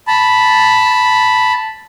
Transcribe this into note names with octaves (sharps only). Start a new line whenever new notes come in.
A5 B5